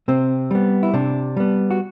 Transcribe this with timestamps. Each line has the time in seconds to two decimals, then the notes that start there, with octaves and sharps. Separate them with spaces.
0.08 C3 C4
0.51 G3 B3
0.83 E4
0.94 C3 D4
1.36 G3 B3
1.71 F#4